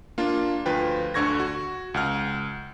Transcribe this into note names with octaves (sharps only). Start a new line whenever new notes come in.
A#3 D4 F4
D2 F3 F4 B4 G5
D2 D3 C#6 G#6 A#6
F#4
C#2 F#5 F6